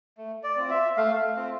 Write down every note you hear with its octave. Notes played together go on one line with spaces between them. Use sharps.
A3
D5
C4 F4
E5
A3 F5
C4 F4